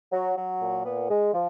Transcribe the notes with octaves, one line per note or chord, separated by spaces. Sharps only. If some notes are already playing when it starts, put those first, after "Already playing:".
F#3
F#3
A#2
B3
G#3
F3